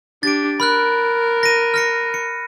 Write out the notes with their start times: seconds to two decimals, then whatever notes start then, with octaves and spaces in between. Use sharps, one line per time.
0.23 D4 G4 A6 D7
0.60 A#4 B5 F6 F#6
1.43 A#6 D#7
1.74 F6 A#6 C#7
2.14 C#7